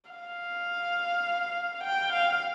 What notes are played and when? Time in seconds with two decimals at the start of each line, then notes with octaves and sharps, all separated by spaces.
0.10 F5
1.84 G5
2.12 F5